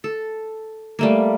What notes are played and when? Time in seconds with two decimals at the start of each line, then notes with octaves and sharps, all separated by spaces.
0.04 A4
0.99 G3 A3 A#3